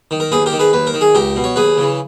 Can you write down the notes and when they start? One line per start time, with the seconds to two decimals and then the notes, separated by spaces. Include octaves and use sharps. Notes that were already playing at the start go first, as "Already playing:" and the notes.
0.11 D#3
0.20 A#4
0.32 D#2 G#4 B4
0.46 G4 A#4
0.52 D#3
0.59 G#4 B4
0.73 D#2 B4
0.87 A#4
0.94 D#3
1.01 G#4
1.15 C#2 G4 A#4
1.36 B2
1.44 C#5
1.56 D#2 G#4 B4
1.77 C#3 E3